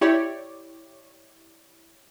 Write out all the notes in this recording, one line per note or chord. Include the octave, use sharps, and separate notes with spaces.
E4 G4 C#5 D5